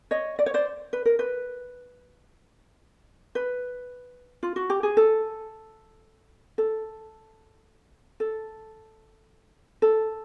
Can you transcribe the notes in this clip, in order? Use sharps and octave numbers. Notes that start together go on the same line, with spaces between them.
C#5 D#5
D5
C#5
C5 D5
B4
A#4
B4
B4
F4
F#4
G4
G#4
A4
A4
A4
A4